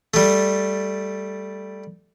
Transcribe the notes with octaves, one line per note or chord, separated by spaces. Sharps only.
G3 A3